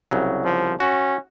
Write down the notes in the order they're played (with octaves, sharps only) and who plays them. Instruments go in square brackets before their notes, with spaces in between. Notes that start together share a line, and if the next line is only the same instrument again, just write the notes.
[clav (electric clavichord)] C2 C#3 F#3
[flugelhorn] F3
[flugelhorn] C#4 [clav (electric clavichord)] F#4